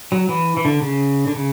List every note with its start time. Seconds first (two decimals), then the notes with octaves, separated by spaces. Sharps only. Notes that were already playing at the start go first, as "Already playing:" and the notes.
0.12 F#3
0.29 E3
0.57 E3
0.65 D3
0.82 C#3
1.27 D3
1.35 C#3